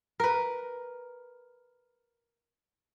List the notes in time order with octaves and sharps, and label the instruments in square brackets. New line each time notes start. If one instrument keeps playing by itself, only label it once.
[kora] A#4 B4